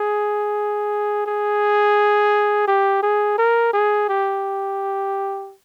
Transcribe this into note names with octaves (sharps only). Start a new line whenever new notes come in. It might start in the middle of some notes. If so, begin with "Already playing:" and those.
Already playing: G#4
G#4
G4
G#4
A#4
G#4
G4